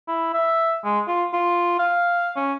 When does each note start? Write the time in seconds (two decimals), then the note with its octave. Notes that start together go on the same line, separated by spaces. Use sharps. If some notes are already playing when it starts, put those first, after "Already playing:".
0.08 E4
0.34 E5
0.84 G#3
1.08 F4
1.33 F4
1.79 F5
2.36 C#4